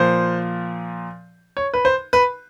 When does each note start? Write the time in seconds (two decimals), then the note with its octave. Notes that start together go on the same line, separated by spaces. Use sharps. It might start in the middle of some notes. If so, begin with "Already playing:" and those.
Already playing: A#2 F3 C5
1.57 C#5
1.74 B4
1.85 C5
2.13 B4